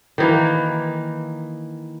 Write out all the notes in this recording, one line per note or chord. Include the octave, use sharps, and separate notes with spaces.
D#3 E3 A#3